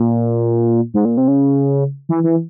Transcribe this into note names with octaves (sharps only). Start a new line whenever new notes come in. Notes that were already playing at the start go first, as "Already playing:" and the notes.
Already playing: A#2
G#2
A#2
C3
C#3
E3
E3